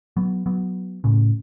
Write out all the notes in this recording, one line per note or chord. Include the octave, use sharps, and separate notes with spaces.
F#3 B3
F#3 B3
A2 C#3